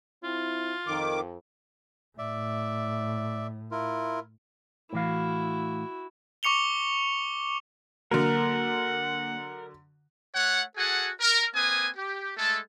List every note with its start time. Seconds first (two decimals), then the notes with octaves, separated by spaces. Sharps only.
0.24 C4 E4 F4
0.87 F2 D#3 D6
2.18 A2 D5 E5
3.71 E4 F4 A#4
4.93 A2 E3 E4 F#4 F5
6.43 C#6 D6 C#7 F7 G7
8.11 D3 F#3 A#3 A#4 F#5
10.35 A3 C#5 F#5
10.77 F#4 G#4 A4 F#5 G#5
11.20 A#4
11.55 A#3 C4 B4 G#5 D#6
11.97 G4
12.37 G#3 A3 A4